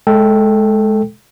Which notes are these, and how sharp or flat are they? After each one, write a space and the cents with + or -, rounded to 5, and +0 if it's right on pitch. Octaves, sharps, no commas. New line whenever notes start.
G#3 +25 A4 +0 G5 +0